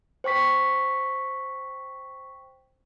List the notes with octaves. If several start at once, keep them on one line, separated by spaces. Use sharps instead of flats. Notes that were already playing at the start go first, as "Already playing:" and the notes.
C5 G5 C#6 B6